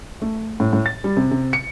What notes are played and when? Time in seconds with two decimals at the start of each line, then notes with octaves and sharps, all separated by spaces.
0.22 A3
0.60 A2
0.73 A2
0.86 A6
1.04 G3
1.17 C3
1.31 C3
1.53 C#7